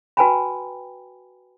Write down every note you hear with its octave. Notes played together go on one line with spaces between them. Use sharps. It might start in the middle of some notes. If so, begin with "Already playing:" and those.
F#4 B4 G5 G#5 A#5 B5